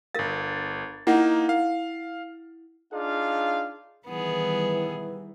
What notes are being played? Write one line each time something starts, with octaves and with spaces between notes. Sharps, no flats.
G1 A#4 F5 A6
A#3 D#4 E4 F#5
F5
D4 D#4 F4 G#4 F5
D#3 E3 G3 B3 G#4